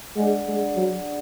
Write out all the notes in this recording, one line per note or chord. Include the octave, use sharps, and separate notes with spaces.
G#3 D4 G#4 D5 F#5
G#3
F#3